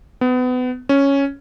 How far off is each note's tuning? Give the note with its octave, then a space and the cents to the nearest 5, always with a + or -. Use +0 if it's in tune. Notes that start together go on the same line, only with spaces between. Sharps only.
B3 +30
C#4 +0